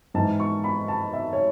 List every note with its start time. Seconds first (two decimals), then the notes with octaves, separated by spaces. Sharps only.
0.14 G#2 A5
0.19 E3
0.40 C#6
0.64 B5
0.88 A5
1.13 E5
1.33 C#5